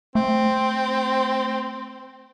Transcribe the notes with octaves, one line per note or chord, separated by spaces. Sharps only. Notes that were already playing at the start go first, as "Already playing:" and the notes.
A3 C4